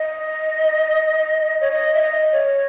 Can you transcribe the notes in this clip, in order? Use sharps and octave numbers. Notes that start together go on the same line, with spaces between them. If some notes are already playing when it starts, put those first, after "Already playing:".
Already playing: D#5
C#5
D#5
E5
D#5
C#5